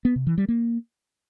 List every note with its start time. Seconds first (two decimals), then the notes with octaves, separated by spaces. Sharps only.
0.05 B3
0.16 C3
0.27 E3
0.38 G3
0.48 A#3